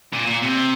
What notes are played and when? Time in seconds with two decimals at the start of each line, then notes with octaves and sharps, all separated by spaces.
0.13 A#2
0.27 A#2
0.42 C3